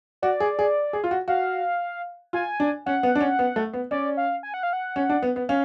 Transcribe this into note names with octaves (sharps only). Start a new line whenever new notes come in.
F#4 D5
G#4
G#4
G#4
F4
F#4
F#4 F5
F4 G#5
D4
C#4 F#5
B3
D4
C#4
B3
A3
B3
C#4 D5
F5
G#5
F#5
F5
F#5
C#4
D4
B3
B3
C#4 F5